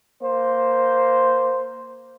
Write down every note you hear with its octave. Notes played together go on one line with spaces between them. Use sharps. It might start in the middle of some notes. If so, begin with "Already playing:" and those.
A#3 C5